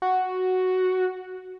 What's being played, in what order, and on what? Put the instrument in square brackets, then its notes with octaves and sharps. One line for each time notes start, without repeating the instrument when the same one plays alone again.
[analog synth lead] F#4